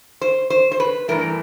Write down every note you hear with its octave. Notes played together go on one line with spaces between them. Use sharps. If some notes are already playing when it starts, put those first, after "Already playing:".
C5
C5
C5
B4
G2 E3 A3 A#4